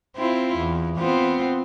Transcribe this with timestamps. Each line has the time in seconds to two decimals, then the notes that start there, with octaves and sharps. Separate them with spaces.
0.17 C4 E4 F4
0.58 E2
0.98 B3 C4 F4